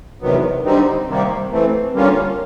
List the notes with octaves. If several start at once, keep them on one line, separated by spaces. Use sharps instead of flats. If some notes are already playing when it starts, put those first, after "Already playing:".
E2 C3 D#3 F#3 B3
D3 G3 C4 D#4
C3 D#3 G3 A#3
E3 A3 C4
D3 G3 A#3 C#4 F4